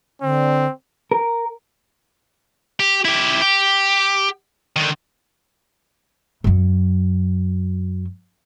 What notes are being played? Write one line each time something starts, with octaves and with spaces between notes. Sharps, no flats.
D3 C4
A#4
G4
E4 G4
G4
D3 D#3
F#2 F#3